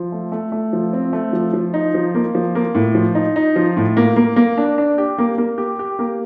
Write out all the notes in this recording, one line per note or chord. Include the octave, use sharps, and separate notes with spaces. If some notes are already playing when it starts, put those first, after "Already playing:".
Already playing: F3
A3
A3
A3
F3
C4
A3
F3
F3
D#4
F3
A#3
F3
A#3
A2
F3
D#4
D#4
F3
A2
A#3
A#3
A#3
D4
D4
G4
A#3
A#3
G4
G4
A#3